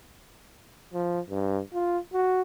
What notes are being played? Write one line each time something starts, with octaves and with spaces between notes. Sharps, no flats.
F3
G2
F4
F#4